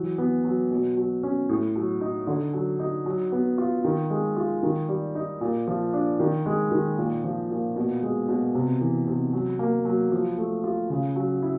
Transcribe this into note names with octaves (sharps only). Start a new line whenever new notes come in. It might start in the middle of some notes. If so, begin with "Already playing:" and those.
Already playing: E3 F#3
B3
F#3
B2
F#3
C#4
A2
F#3
D#4
D3
F#3
D#4
F#3
B3
F4
D#3
G#3
F4
D#3
G3
D#4
A#2
F3
D4
D#3
G#3
D#3
A#2
F3
A#2
B2
G#3
B2
C3
E3
C3
F#3
A#3
F#3
F3
A3
F4
C#3
F#3
E4